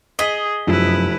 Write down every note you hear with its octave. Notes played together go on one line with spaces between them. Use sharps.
G#4 D#5 D#6 B6
F1 F#2 F3 E4 B4 E6